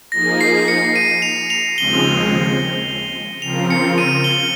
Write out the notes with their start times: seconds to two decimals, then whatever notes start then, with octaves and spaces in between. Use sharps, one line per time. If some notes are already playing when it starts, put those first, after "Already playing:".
0.12 F3 A#3 D#4 G#4 A#6
0.41 C7
0.68 C#7
0.96 D#7
1.22 F7
1.50 F7
1.78 D#2 C#3 F3 G#3 C4 G7
3.42 C#3 F3 C4 F4 A#4 F7
3.70 C#7
3.98 D#7
4.24 G7